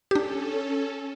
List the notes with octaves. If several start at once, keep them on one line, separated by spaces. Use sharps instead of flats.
C#4 D4 G4 A4